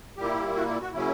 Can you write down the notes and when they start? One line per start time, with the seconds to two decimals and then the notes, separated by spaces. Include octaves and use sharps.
0.18 A#2 G3 A#3 E4 G4
0.56 F#4
0.68 E4
0.81 F#4
0.93 C#3 F#3 A#3 C#4 E4